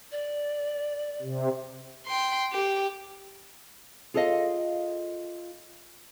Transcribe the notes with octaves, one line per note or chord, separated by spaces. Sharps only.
D5
C3
G5 C6
G4
F4 G#4 A4 C#5 D#5 F5